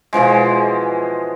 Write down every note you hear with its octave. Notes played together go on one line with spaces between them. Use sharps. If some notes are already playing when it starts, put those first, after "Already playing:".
B2 E3 F3 G#3